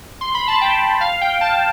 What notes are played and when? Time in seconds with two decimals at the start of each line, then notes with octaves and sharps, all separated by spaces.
0.21 C6
0.34 B5
0.48 A5
0.61 G5
1.01 F5
1.21 G5
1.41 A5